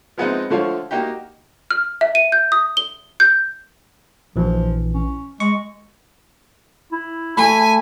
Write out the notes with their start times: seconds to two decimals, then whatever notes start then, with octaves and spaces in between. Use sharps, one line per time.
0.18 F3 G#3 B3 C4 D#4
0.50 D3 F3 A3 F4 C#5
0.91 A#3 D#4 F#4 G4
1.71 F6
2.01 E5
2.15 D#7
2.32 G6
2.52 D#6
2.77 G7
3.20 G6
4.36 A#1 E3 F3
4.94 C#4
5.40 G#3 C#6
6.92 E4
7.37 A3 G#5 B5